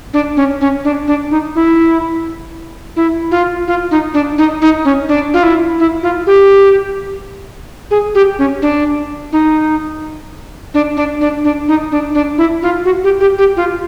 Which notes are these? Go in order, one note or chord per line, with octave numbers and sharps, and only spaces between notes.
D4
C#4
C#4
D4
D4
D#4
E4
E4
F4
F4
D#4
D4
D#4
D#4
C#4
D4
F4
E4
E4
F4
G4
G#4
G4
C#4
D4
D#4
D4
D4
D4
D4
D#4
D4
D4
E4
F4
F#4
G4
G4
G4
F4